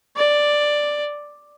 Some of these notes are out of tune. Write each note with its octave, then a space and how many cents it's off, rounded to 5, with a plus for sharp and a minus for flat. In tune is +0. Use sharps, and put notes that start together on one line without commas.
D5 +5